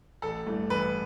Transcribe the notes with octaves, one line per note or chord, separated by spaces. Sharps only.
A1 A4
G2 E3 A3
A1 B4